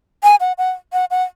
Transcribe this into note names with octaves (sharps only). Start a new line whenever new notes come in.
G#5
F#5
F#5
F#5
F#5